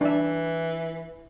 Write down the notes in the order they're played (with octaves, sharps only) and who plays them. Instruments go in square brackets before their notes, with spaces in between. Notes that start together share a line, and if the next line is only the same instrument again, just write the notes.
[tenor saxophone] E3 [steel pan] D4 E5